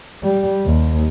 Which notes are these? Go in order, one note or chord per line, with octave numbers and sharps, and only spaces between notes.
G3
D#2